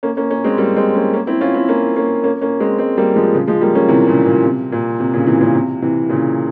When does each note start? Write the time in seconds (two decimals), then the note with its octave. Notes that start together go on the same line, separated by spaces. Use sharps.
0.03 A#3 C#4
0.17 A#3 C#4
0.31 A#3 C#4
0.44 G#3 C4
0.58 G3 A#3
0.76 G#3 C4
0.95 A#3 C#4
1.13 A#3 C#4
1.27 C4 E4
1.41 C#4 F4
1.54 C4 E4
1.68 A#3 C#4
1.96 A#3 C#4
2.24 A#3 C#4
2.41 A#3 C#4
2.60 G#3 C4
2.78 G#3 C4
2.97 G3 A#3
3.16 F3 G#3
3.34 C#3 F3
3.48 F3 G#3
3.61 G3 A#3
3.75 A#3 C#4
3.89 C3 E3
4.07 A#2 C#3
4.26 A#2 C#3
4.44 C3
4.72 A#2
5.00 C3
5.14 A#2 C#3
5.27 C3 E3
5.41 A#2 C#3
5.55 C3
5.82 C3 E3
6.09 A#2 C#3